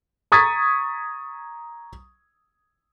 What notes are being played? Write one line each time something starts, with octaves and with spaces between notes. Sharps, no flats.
A#5 C#6 D#6 G#6 A6 B6